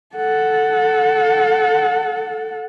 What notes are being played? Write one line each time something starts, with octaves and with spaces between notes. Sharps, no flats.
A4 F#5